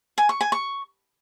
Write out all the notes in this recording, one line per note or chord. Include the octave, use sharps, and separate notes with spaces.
G#5
C#6
G#5
C#6